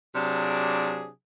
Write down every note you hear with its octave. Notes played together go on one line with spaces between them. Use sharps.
C3 F#3 D4 G#4